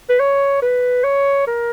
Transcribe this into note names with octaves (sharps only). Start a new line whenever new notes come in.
B4
C#5
B4
C#5
A#4